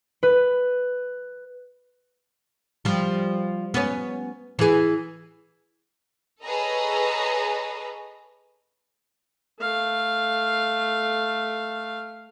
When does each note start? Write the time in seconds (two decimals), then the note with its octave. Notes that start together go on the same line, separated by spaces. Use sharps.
0.23 B4
2.85 F3 G3
3.74 B3 C#4
4.59 E3 G#4
6.45 G#4 A4 B4 C#5 D#5 A#5
9.60 A3 F5